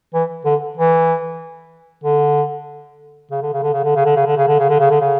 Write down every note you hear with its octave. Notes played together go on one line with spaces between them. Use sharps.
E3
D3
E3
D3
C#3
D3
C#3
D3
C#3
D3
C#3
D3
C#3
D3
C#3
D3
C#3
D3
C#3
D3
C#3